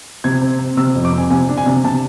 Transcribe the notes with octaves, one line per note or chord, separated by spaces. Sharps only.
C3 G#6
C4
C4
C3 E6
F2
D6
C4
G#5
C3 G#5
D4
G#5
C3
C3 A5